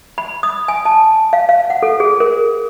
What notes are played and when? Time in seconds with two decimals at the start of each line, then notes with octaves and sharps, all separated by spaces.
0.18 B5
0.43 D#6
0.68 G#5
0.85 A5
1.33 F5
1.49 F5
1.70 F#5
1.83 A4
2.00 G#4
2.20 A#4